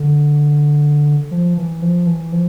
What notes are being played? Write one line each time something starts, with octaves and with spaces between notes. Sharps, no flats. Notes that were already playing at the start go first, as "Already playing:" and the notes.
Already playing: D3
F3
E3
F3
E3
F3